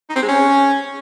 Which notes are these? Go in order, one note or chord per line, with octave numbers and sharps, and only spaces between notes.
D#4
C4
G#3
C#4